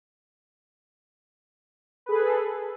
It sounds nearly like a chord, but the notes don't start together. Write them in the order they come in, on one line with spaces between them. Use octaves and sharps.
B4 G#4 A4